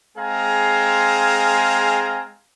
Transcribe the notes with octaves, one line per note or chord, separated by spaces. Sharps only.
G#3 C4 G#4 F5 G#5 A#5